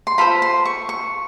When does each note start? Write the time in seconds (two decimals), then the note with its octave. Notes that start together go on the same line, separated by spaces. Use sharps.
0.07 C6
0.18 F4 A4 C5 B5
0.42 C6
0.65 C#6
0.89 C#6